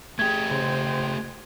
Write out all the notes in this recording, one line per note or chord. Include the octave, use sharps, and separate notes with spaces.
A3 G4 G#4 G#6
C#3 C5